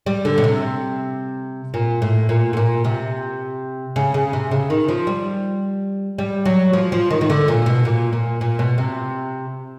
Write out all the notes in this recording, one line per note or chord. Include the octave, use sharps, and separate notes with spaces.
G3
D3
B2
C3
A#2
A2
A#2
A2
A#2
C3
C#3
C#3
C3
C#3
D#3
F3
G3
G3
F#3
F3
F3
D#3
D#3
D3
A#2
B2
A#2
A#2
A#2
B2
C3